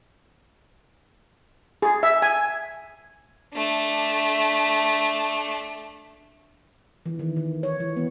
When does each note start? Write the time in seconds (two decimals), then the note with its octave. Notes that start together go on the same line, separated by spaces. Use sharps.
1.82 G#4
2.03 E5
2.22 G#5
3.53 A3 D4
7.06 E3
7.19 D#3
7.37 D#3
7.63 C#5
7.80 E3
7.96 B3